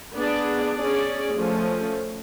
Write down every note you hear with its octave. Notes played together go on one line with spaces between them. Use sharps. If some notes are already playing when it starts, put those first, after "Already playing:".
B3 D4 G#4 D5
C#4 G#4 D5
F3 A3 C#4